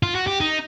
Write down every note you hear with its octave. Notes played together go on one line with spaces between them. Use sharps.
F4
F#4
G4
D#4